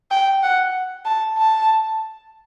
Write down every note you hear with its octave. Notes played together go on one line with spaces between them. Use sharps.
G5
F#5
A5
A5